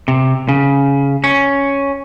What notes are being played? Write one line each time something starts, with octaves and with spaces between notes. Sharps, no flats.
C3
C#3
C#4